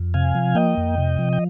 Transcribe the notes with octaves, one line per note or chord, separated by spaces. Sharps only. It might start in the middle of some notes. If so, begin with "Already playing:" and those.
Already playing: F2
C3 F5 G#5
F3
A#3 D#5 G5
F2
C3
F3
G5